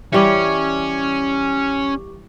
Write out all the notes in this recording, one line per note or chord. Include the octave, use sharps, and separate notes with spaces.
E3 G3 C#4 G4 C#6 D6